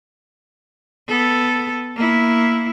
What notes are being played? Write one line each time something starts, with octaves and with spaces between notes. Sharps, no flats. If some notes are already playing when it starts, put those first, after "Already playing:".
B3 A4
A#3 E4